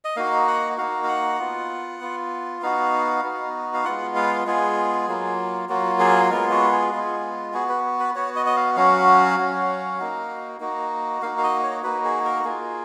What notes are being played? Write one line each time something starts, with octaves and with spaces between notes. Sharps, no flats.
D#5
A#3 D#4 F#4 F5
F#5
A#3 D#4 F#4 F5
F5
F#5
B3 F4
B3 F4
B3 D#4 F#4 F5
B3 D#4 F#4
F5
G#3 B3 F4 F#5
F5
G#3 B3 F4 G#4
F#3 A#3 F4
F#3 A#3 F4 F#4
G#4
G#3 B3 F4 A#4
F#4
G#4
G#3 B3 F4
B3 F#4 G#4
B4
B4
B3 F#4 C#5
D#5
D#5
F5
F#3 C#4 F#4 F5
F#3 C#4 F#4
A#3 D#4 F#4
A#3 D#4 F#4
A#3 D#4 F#4 F5
F5
D#5
C#5
A#3 D#4 F#4 B4
G#4
A#4
A#3 F4 G#4